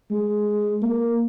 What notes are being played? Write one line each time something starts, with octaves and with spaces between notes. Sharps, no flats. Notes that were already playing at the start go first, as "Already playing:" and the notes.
G#3
A#3